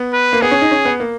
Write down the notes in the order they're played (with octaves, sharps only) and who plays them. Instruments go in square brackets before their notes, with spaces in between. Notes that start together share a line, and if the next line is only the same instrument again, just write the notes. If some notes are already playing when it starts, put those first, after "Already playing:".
Already playing: [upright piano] B3
[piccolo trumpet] B4
[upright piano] A#3
[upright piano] B3 [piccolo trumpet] G#4
[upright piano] C#4
D#4
C#4
B3
A#3